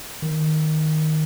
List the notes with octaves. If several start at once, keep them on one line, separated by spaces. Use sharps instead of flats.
D#3